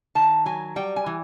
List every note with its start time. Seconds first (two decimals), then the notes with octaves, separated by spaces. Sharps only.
0.15 D#3 A5
0.46 F#3 G#5
0.76 G3 G5
0.96 G#5
1.06 E3